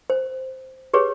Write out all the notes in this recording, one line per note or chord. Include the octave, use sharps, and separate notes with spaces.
C5
G4 G#4 B4 C#5